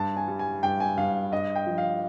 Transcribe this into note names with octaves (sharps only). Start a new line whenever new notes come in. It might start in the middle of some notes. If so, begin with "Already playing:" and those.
Already playing: G2 A5
G#5
G3
G#5
G2 G5
G#5
G2 F5
G2 D#5
G5
F3
F5